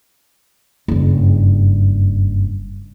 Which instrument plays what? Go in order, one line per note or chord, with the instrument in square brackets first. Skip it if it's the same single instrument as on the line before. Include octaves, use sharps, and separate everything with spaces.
[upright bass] F#1 G2